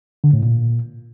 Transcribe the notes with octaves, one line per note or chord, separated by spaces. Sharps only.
D3
A2
A#2